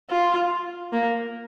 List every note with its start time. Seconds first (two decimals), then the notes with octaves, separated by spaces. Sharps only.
0.10 F4
0.93 A#3